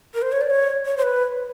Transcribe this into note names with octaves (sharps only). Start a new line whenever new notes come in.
A#4
C5
C#5
D5
C#5
C#5
C5
B4